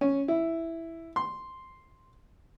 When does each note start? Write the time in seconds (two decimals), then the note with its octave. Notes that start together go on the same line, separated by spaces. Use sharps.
0.01 C#4
0.28 E4
1.16 C6